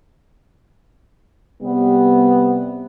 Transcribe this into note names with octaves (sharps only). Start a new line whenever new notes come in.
C3 G3 B3